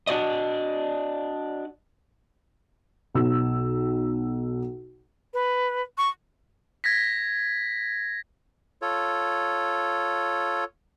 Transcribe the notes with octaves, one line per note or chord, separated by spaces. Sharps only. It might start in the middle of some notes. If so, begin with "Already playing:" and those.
D4 F#4 D5 D#5
B1 E6
B4
C#6
G#6 A#6 B6
F4 A4 C#5